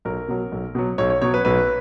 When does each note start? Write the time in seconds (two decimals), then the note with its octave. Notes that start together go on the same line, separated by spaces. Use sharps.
0.05 B1 A#4
0.28 B2 F#3
0.52 B1
0.75 B2 F#3
0.98 B1 C#5
1.10 C#5
1.21 B2 F#3 C#5
1.34 B4
1.45 B1 B4